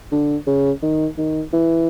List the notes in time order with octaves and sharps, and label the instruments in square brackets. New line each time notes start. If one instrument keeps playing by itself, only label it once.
[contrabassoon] D3
C#3
D#3
D#3
E3